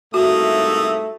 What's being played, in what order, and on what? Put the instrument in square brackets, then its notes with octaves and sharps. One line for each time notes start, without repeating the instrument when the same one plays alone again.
[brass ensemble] C2 G#2 E5 [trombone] A3 [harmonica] A#3 D#6 [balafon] F#4